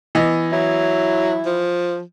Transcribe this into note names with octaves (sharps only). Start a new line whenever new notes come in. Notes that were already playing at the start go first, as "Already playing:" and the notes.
E3 B3 D#5
F#3 E4
F3